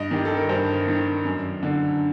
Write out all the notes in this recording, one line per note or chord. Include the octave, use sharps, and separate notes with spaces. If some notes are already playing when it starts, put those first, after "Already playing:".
Already playing: G2 D#5
D#3 G4
A4
A#4
G2 C5
D#3
F#2
D3